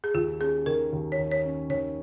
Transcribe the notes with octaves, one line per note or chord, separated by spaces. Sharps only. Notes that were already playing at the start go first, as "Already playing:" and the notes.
G#4
D#2 F4
C#4 G#4
D#3 A#4
D#2
C#5
D#2
C#5
C#4
D#3 C#5